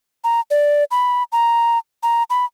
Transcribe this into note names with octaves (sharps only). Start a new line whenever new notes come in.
A#5
D5
B5
A#5
A#5
B5